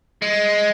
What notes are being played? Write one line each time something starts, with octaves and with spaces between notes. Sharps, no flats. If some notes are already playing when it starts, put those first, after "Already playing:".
G#3